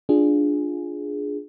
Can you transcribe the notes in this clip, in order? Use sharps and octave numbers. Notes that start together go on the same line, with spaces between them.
D4 F4 G#4